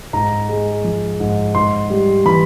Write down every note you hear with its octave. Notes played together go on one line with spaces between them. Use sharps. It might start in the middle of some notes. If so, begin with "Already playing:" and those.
G#2 A#5
G#3
F3
G#2
G#2 C6
G3
E3 B5